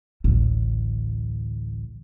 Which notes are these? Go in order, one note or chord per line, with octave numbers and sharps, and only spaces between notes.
A1 D2